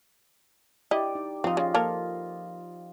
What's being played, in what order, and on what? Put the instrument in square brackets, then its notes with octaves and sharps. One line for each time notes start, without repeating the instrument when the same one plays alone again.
[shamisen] E4 D#5 [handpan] G4 D5
[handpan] D#4
[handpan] F3 F4 D#5 [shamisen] C4 D#4
[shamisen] C#3
A#3 A4 A#4